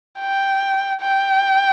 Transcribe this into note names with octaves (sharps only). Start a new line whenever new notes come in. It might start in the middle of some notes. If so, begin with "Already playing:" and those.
G5
G5